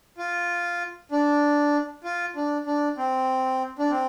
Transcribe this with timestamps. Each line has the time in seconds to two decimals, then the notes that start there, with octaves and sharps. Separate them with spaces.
0.18 F4
1.12 D4
2.04 F4
2.36 D4
2.67 D4
2.98 C4
3.79 D4
3.90 C4